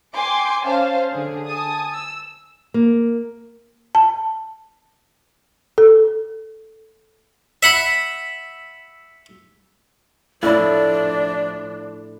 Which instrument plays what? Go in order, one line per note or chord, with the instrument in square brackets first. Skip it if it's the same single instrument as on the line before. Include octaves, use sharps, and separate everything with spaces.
[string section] G5 G#5 C6 D6
C#4 C5 F5 A5
D3 G#4
G#5 A5 D#6
E6
[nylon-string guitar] A#3
[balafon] A5
A4
[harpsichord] E5 F#5 B5
[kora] A2 E4 [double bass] F3 D4 [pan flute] D5